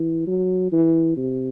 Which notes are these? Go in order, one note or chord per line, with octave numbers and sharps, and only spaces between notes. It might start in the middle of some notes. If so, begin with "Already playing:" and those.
Already playing: E3
F#3
E3
C3